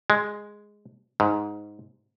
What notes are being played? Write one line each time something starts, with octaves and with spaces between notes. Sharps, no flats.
G#3
G#2